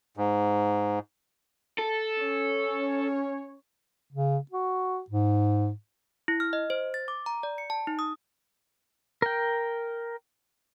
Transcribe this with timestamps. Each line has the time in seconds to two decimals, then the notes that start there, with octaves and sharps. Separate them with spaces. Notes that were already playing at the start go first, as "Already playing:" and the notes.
0.17 G#2
1.79 A4
2.20 C#4 C#5
4.12 C#3
4.51 F#4
5.10 G#2
6.28 E4
6.40 F6
6.53 D#5
6.70 C5
6.94 A6
7.08 D6
7.26 A#5
7.43 D5
7.58 C#7
7.70 A5
7.87 D#4
7.99 D#6
9.22 A#4 G5